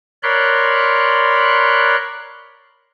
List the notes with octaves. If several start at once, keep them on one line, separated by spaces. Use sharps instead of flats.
A#4 C#5 D5 B5 C6 F#6